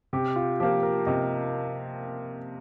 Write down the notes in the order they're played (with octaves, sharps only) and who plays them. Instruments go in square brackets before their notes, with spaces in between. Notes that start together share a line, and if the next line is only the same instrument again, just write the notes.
[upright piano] C3 [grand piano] G4
[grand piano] F4
[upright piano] F3 A#3 [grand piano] G4
[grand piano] A#4
[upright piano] C3 [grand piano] D#5